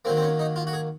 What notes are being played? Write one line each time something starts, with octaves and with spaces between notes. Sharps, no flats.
D#3 F#3 A#3 C4
C4
C#4
D#4
F4
F#4
G#4